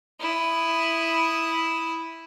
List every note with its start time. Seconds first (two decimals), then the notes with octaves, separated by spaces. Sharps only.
0.20 E4 D#6